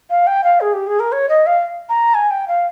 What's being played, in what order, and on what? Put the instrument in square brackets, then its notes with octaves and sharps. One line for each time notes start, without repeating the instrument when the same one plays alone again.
[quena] F5
G5
F5
G#4
G4
G#4
A#4
C#5
D#5
F5
A#5
G#5
G5
F5